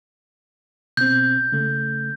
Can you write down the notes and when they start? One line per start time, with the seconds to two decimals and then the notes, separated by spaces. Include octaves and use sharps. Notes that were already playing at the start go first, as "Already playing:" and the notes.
0.97 B2 C4 G6
1.52 C#3 A3